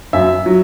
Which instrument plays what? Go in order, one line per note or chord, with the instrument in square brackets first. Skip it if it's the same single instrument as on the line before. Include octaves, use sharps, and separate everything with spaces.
[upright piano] F#2 E5
F#3